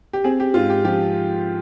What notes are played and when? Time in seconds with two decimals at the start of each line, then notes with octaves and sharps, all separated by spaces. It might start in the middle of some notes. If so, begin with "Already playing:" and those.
0.13 G4
0.24 C4 G#4
0.40 G4
0.54 G#2 F4
0.70 G4
0.85 F3 G4